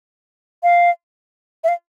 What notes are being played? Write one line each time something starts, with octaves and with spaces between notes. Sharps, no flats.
F5
E5
F5